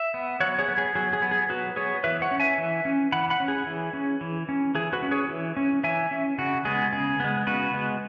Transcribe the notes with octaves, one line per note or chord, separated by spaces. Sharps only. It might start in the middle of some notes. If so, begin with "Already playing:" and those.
Already playing: E5
B3
F#3 C#5 F#5
G#4 C#5
B3
G#4
F#3 G#4
G#4
B3
G#4
F#3 F#4 B4
B3 G#4 C#5
E3 B4 E5
C#5 F#5
C#4
E5 G#5
E3
C#4
E3 F#5 B5
F#5 B5
C#4
G#4
E3
C#4
E3
C#4
E3 G#4
F#4 B4
C#4
G#4 C#5
E3
C#4
E3 E5 G#5
C#4
C#3 F#4
G#3 B3 G#4
C#3 G#4
G#3 B3
C#3 F#4 B4
G#3 B3